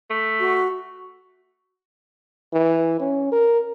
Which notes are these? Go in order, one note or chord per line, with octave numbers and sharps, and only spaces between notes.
A3
F#4
E3
C#4
A#4